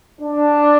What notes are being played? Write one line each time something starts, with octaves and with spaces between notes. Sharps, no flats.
D4